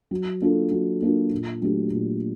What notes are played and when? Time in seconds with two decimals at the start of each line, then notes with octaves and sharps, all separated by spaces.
0.11 F#3
0.41 A#3 D4 F4 A4
0.71 F#3
1.02 A#3 D4 F4 A4
1.32 A#2
1.62 F#3 A3 D4 G4
1.92 A#2